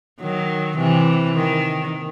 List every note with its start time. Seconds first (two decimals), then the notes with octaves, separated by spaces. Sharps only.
0.21 D#3 F#3
0.77 C3 E3
1.34 D#3